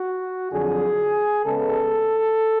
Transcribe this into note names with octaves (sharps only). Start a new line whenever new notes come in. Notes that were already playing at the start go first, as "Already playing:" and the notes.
Already playing: F#4
F2 D3 F#3 G#4
C#3 G#3 B3 A4